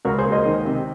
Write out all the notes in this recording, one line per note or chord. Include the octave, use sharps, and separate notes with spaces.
C#2 F#4 A#4
G#4 C5
A#3
C5 D#5
D#3
C3